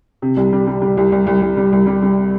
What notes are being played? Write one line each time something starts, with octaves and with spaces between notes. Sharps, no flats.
C3
C2
G3
G3
G3
C2
C2
C2
C2
G3
C2
G3
G3